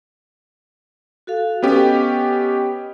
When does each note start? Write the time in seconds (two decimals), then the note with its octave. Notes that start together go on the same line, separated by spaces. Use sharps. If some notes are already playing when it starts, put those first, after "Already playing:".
1.27 F#4 A4 F5
1.62 B3 C#4 G4 D#5